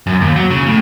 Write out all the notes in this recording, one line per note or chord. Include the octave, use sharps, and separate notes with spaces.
F#2
D#2
F#3
C#3
A2